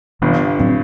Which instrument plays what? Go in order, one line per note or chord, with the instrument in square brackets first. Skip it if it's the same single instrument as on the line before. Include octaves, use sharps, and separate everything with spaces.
[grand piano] G1 G2 [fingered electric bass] C3 E3 B3
[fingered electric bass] A2 F#3 C4